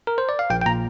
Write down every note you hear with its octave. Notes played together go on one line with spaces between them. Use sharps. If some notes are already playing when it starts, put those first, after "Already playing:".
A#4
C5
D5
F5
A#1 G5
G5
A#2 A#5